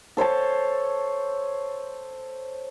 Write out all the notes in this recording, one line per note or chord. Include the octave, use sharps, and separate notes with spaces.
A4 C5 C#5 A5